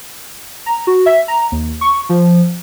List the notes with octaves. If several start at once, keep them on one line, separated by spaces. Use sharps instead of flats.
A#5
F#4
E5
A#5
D#2
C#6
F3